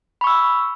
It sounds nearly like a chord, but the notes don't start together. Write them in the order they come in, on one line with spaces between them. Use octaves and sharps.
B5 C#6 E6